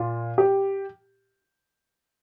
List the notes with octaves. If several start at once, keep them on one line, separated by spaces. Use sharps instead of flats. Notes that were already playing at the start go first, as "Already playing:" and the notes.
Already playing: A#2 F4
G4